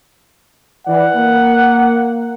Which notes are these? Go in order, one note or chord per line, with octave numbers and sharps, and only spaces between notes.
E3 D5 F#5
A#3